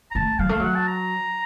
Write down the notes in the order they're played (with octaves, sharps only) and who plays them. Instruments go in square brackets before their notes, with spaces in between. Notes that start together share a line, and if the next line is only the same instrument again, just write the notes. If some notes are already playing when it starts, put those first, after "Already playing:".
[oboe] A#5
[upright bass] A3 [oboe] A5
[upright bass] F#3 [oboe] F5
[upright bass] A3 [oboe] F5
[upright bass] F#3 [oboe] F#5
[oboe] A5
A#5